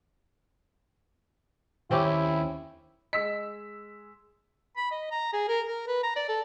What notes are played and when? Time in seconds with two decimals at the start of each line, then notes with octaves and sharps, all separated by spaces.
1.91 D#2 C4 C#4 E4 G4
3.13 G#3 D#5 E6 B6
4.77 B5
4.91 D#5
5.11 A#5
5.33 G#4
5.48 A#4
5.67 A#4
5.88 B4
6.03 A#5
6.16 D5
6.29 A4